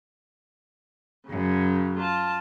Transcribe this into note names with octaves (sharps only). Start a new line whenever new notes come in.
F#2 C#3 F#3
F4 A5